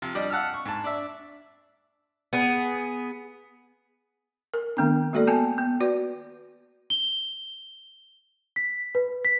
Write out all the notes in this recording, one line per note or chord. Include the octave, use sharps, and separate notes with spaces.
C3 F3
G3 D4 D5 D#5
F5 F#5 A5 E6 F6
C#6
G#2 A5
D4 D5 E5
B3 G#4
A#4
D#3 A3 B3 C4 D4
G#3 A#3 F#4 A4 D5
B3 G#5 A5
B3
F#4 B4 D5
G7
B6
B4
B6